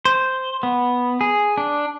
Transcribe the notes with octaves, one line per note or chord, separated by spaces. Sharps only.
C5
B3
G#4
D4